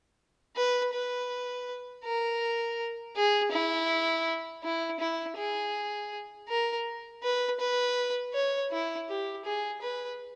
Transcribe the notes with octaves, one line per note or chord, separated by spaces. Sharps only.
B4
B4
A#4
G#4
E4
E4
E4
G#4
A#4
B4
B4
C#5
E4
G4
G#4
B4